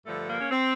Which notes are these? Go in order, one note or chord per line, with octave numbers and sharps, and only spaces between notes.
G2 D3 F3 A3
A#3
C#4
C4